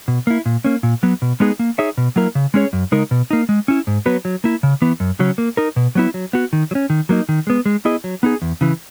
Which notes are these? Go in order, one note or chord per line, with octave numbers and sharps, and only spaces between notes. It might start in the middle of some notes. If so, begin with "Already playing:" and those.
B2
A#3 E4
A#2
A#3 C#4
A#2
F#3 B3
B2
G#3 B3 D#4 G#4
A#3
D#4 G#4 C#5 E5
B2
F#3 A#3 E4 A#4
C#3
G#3 C#4 G#4 C#5
F#2
C#3 G#3 D#4 A#4
B2
A#3 D#4
G#3
C#4 E4
G#2
F#3 B3 F#4 B4
F#3
A#3 E4
C#3
E3 B3
F#2
C#3 F#3 C#4
A#3
D#4 A#4
B2
F#3 B3 E4
F#3
B3 F#4
D#3
F#3
C#4
D#3
F#3 A#3 D#4
D#3
G#3 B3
G#3
B3 E4 G#4 D#5
F#3
B3 D#4 G#4
E2
C#3 E3